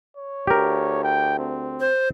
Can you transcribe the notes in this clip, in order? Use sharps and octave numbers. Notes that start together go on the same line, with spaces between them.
C#5
D2 G4 A#4
G5
C4
C5